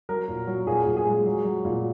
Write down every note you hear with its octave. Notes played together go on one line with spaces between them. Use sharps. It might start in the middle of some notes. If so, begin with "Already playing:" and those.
F#3 A#4
A#2
F#3
A#2 G#4
A#2
G#4
G#3
F#3
F#3
A#2